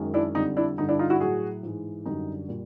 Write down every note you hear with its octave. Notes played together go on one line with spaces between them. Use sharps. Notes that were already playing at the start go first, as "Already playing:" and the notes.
Already playing: F#2 D#3 G#3
D4 E4
F2 D3 G3 D#4
D4 E4
G2 D3 G3 D#4
D4 E4
D#4 F4
E4 F#4
A2 F#3 F#4 G#4
G#2 E3 G#3
F#2 D3 G3 D#4
A#2 G3